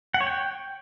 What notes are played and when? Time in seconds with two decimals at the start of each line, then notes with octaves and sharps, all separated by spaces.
0.14 F#5
0.21 C#5
0.27 G5